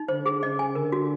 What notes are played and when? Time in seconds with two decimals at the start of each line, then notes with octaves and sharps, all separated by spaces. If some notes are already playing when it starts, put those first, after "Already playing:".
Already playing: D#4
0.08 D3 C5
0.26 G#4
0.42 C#3 D#5
0.59 G#5
0.75 D3 A#4
0.92 F#4